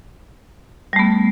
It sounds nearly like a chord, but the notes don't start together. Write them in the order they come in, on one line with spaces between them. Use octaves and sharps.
G3 A3 B3